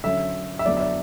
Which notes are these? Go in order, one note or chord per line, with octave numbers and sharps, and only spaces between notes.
D3 F#3 C#4 E5
E5
D3 F#3 B3 D4 D5
E5
D5